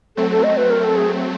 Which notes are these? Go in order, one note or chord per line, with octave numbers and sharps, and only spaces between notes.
F#3 A3 C4 A4
A4
D#5
B4
A#4
A4
G#4